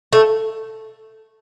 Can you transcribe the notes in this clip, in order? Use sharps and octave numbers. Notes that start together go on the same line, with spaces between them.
A3